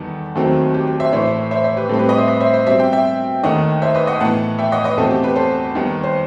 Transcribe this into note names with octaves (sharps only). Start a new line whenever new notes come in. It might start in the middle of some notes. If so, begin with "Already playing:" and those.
Already playing: E2 D#3 G3 B3 A4
D#2 D#3 F#3 A3 C4
G4
G4
C5 E5
A2 E3 A3 C5 E5
C5 E5
C5 E5
G4 B4
A2 G3 C4 A4
G4 B4
B4 D#5
C5 E5
B4 D#5
C5 E5
C5 E5
B2 G3 C4 C5 E5
E5 G5
E5 G5
D#2 D#3 A3 D#5 F#5
C5 E5
B4 D#5
D#5 F#5
A2 E3 B3 F#5 A5
E5 G5
D#5 F#5
B4 D#5
E2 B2 A3 C4 A4
G4
G4 B4
A4 C5
D#2 D#3 G3 B3
C5